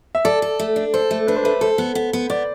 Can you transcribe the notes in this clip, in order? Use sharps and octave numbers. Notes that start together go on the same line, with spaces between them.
E5
A4 D5
A4
A3
D4
A4 C5
A3
D4 B4
C5
A3 B4
A4 C5
B3
B3
B3
B3 D5